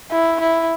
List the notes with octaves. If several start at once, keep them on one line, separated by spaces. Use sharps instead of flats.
E4
E4